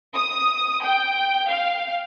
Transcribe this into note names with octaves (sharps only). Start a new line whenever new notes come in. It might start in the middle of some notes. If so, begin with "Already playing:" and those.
D#6
G5
F5